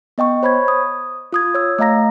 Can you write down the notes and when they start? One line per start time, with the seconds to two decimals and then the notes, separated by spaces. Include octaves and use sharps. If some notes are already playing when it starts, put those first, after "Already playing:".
0.18 B3 D#5 G5 C#6
0.43 C5 C#5 B5 C#6 G#6
0.68 D#6
1.32 F4 D#6 G#6
1.55 C#5 E6
1.79 A3 D#5 F5 A#5 A#6